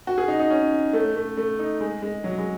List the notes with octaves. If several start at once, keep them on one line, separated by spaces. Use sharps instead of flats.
F#4
G#4
D#4
D#4
C#4
A3
A3
A3
D#4
G#3
G#3
F#3
G#3